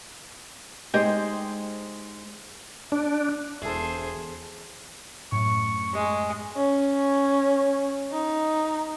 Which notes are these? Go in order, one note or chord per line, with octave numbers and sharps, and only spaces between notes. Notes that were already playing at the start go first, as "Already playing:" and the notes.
G#3 D#4 G4 C5 D#5
D4
E1 E4 G#4 A4 C5
F#2 A2 C#6
G#3
C#4
D#4